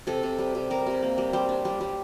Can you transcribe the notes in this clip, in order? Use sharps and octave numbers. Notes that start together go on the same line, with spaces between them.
C3 A4
C3
G3
C3
G3 A#4
C3
A#3
G3
G3 C5
D4
G3
G3